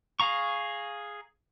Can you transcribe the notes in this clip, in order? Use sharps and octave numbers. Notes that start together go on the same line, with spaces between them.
G#4 F5 A#5 C#6